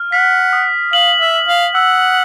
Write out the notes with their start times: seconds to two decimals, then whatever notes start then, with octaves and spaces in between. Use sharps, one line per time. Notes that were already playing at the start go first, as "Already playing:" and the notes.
Already playing: F6
0.12 F#5 B6
0.53 D#6
0.93 F5 F#7
1.20 E5
1.34 F#7
1.48 F5
1.75 F#5 E6